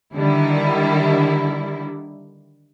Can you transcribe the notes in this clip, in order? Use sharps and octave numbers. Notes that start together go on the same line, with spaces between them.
D3 D#3 G3 E4